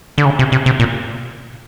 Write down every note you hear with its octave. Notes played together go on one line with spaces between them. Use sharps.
D3
C#3
C3
C3
C3
A#2